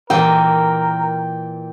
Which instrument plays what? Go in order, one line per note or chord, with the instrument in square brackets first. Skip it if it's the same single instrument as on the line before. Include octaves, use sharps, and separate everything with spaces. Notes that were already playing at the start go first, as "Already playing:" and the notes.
[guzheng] A#2 E3 [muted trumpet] A#4 [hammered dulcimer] G5